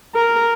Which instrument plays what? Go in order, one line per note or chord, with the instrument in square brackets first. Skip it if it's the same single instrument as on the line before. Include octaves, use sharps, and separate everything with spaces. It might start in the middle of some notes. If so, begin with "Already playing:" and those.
[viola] A#4